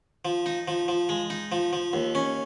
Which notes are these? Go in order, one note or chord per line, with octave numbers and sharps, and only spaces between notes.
F3
D#4
F3
F3
G#3
D#4
F3
F3
D#2
C#4